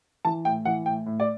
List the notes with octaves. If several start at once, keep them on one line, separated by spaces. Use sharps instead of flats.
E3 A5
A2 G5
E3 F#5
A2 G5
A2
D5